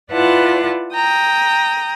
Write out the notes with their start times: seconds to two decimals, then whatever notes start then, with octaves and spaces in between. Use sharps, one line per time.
0.11 E4 F4 B4 D5 F#5 A5
0.93 G5 A#5 D#6